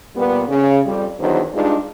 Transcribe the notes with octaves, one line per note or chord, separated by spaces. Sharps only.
A#2 G3 B3
C#3
F2 G3
E2 G2 D#3 F#3 C5
G2 G#3 D4 D#4 F4